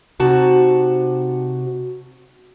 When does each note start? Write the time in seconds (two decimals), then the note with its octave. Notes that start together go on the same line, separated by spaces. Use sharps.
0.20 C3 D#4 F#4 A5